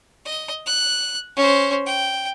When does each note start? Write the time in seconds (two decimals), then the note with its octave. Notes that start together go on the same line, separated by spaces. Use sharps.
0.25 D#5
0.66 F#6
1.37 C#4 C5
1.86 G5